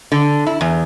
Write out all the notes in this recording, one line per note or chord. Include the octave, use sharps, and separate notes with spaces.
D3
E4
E2